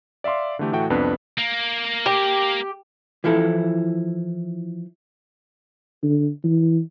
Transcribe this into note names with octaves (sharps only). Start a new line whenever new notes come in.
D5 E5 F5 C6 D6
D3 E3 A3 G4
A2 E3 A3 F#4 G5
C2 F2 C3 B3 D4 B4
A#3
G4
E3 F3 E4 A4
D3
E3